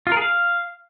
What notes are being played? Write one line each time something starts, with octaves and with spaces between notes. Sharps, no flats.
F4
A#4
G#4
F5